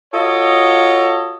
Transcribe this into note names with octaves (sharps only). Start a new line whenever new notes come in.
F4 F#4 A4 C#5 D#5